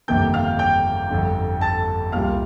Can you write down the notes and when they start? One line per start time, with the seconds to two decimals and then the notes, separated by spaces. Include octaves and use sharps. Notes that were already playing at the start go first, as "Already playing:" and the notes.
0.08 G1 F2 C3 D#3 A#3 G5 G6
0.34 F5 F6
0.59 G5 G6
1.10 G1 F2 D3
1.61 A5 A6
2.12 C2 A#2 G3 A#3 F5 F6